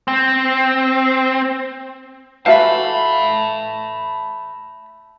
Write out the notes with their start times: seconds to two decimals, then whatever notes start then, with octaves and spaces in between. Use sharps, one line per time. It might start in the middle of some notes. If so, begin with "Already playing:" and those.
0.08 C4
2.46 E3 A3 F4 F#4 E5 F5 A5 B5